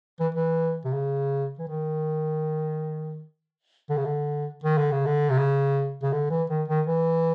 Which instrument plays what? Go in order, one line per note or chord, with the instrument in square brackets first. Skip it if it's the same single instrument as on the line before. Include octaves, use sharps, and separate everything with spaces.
[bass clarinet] E3
E3
C3
C#3
E3
D#3
D3
C#3
D3
D#3
D3
C#3
D3
C3
C#3
C#3
D3
E3
D#3
D#3
E3